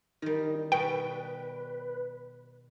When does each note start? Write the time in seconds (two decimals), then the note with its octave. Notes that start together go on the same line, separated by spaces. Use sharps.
0.22 D#3 G3 D#4
0.72 B2 G3 B3 B4 G5